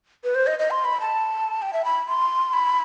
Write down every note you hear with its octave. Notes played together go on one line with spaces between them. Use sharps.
B4
C5
D#5
D#5
C6
B5
A5
G5
E5
B5
C6
B5